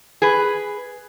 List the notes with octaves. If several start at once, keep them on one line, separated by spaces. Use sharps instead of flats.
G#4 B4